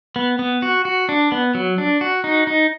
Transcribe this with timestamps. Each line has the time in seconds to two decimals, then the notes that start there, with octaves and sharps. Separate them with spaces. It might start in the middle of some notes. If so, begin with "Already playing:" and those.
0.16 B3
0.39 B3
0.62 F#4
0.85 F#4
1.09 D4
1.32 B3
1.55 F#3
1.78 D4
2.01 F#4
2.24 D#4
2.47 D#4